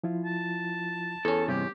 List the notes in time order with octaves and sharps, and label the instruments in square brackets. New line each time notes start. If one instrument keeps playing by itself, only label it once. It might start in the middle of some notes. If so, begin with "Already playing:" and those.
[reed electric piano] F3 E4 F4
[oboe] A5
[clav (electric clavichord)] E2 C#4 [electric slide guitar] A4
[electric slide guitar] G2 C3 [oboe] G4